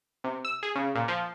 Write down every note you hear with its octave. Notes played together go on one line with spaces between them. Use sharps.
C3
E6
G#4
C#3
A#2
F3